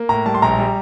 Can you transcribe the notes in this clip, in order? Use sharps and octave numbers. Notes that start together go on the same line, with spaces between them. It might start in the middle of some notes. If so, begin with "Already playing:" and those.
Already playing: A#3
A2 A#5
G3 A5
C6
A#1 A#5
G3